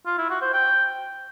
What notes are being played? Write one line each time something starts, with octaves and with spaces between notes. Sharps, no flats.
F4
E4
F#4
C5
G5